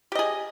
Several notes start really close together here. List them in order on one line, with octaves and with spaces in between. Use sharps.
G4 D#5 G#4